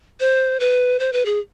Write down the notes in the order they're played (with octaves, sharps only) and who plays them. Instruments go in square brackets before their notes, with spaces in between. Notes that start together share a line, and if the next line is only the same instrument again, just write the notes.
[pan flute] C5
B4
C5
B4
G#4